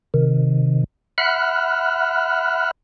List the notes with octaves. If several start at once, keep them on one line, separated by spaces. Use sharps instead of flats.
C3 D#3
E5 F#5 B5 F6 F#6